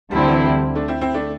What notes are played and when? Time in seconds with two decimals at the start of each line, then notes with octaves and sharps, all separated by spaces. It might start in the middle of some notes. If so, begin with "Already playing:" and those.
0.11 D2 D3 G3 C4 E4
0.28 E3
0.45 G3
0.75 A3 D4
0.88 C4 E4
1.01 C4 E4
1.14 A3 D4